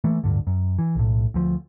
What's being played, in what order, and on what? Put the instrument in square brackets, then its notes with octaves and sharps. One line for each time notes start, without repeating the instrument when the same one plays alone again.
[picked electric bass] E3 A3 A#3
D1 G2 D3
F#2
E3
B1 A2
D2 F3